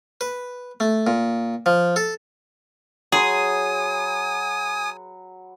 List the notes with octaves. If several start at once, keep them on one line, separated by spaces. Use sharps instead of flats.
B4
A3
A#2
F3
A4
F#3 G#4 B4 G#5 C6 D#6